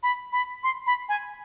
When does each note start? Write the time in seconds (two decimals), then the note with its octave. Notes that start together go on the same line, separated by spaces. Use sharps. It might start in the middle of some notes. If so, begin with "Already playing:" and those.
0.03 B5
0.32 B5
0.63 C6
0.86 B5
1.09 G#5